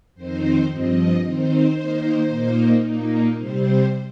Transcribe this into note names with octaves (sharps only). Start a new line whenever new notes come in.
F2 D#3 C4 D#4 C5
G2 F3 C4 D#5
D#3 C4 D#4 C5
D#3 A#3 D#4
A#2 A#3 D#4
A#2 A#3 D#4
C3 G3 C4 C5